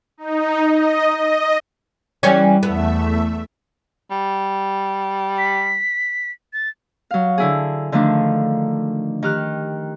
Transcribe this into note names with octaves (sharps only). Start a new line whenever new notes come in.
D#4
D#5
D#5
E3 G3 C#4
E2 A3 B3 E5
G3
B6
A6
F#3 F5
D3 E4 G#4
D3 D#3 F3 A3 D4
D#3 G4 F6 F#6